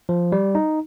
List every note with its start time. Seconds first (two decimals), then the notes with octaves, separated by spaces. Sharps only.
0.09 F3
0.32 G3
0.55 D#4